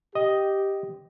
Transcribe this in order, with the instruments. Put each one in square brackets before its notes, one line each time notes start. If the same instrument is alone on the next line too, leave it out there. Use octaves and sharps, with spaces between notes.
[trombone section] G4 [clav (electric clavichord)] D#5